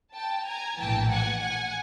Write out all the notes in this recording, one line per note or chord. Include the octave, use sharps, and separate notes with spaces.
G5 A5
G#5 A#5
A#1 A2 E3 G5 A5
F#5 G#5
F#5 G#5